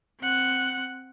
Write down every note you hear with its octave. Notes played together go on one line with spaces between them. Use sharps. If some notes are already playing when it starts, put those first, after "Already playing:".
C4 F#5